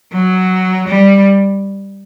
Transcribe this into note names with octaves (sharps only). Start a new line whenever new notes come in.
F#3
G3